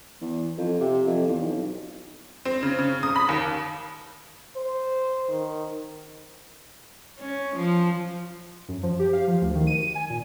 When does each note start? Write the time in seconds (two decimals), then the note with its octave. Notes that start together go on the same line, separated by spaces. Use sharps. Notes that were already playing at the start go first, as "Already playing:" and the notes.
0.21 E2
0.58 F2
0.80 C3
1.07 F2
1.27 E2
1.40 B1
2.45 C4
2.63 C#3
2.79 C#3
3.03 D#6
3.16 B5
3.29 D#2
4.56 C5
5.29 D#3
7.19 C#4
7.57 F3
8.68 F#2
8.83 F3
8.99 G4
9.13 F5
9.27 F3
9.41 D2
9.55 D#3
9.67 D#7
9.80 D#7
9.95 G#5
10.10 A#2